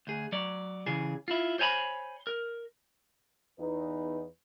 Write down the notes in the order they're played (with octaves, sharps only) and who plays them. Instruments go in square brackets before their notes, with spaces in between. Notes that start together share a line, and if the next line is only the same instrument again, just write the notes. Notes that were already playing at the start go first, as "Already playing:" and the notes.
[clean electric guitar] D2 G#4
F#3 D5
C#3 E3 G#4
E4 F4
C5 C#5 G#5 A#5 B5
A#4
[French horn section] E2 D#4 B4